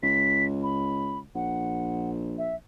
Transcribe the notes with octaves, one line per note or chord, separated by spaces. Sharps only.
C#2 B6
B5
A#1 F#5
E5